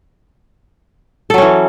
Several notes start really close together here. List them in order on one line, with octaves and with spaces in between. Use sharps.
A4 F#3 C#4 E3